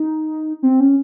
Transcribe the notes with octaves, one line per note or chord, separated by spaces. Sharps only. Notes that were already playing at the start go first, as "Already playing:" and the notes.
Already playing: D#4
C4
C#4